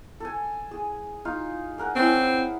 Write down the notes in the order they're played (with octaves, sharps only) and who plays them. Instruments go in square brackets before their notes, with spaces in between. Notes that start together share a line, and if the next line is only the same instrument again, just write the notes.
[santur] A4 G#5
G#4
D#4 F4 F5
G#4 A#4 F#5
[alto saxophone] C4 [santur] C#4 E4